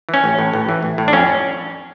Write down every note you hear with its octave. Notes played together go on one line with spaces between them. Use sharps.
E3
C#4
A1
A2
A1
E3
A1
A2
D4
F2 C#4